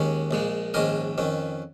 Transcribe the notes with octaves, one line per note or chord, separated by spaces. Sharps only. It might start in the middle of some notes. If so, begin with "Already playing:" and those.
Already playing: D#2 D#3 G#3 C#4
A#1 A#2 G#3
A#1 G#2 D#3 C#4 A#4 D#5
F2 D#3 C#4